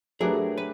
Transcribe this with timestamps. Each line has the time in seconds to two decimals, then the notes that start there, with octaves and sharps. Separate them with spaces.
0.20 F#3 A3 D4 G4 G#4 A#4 B4
0.58 B4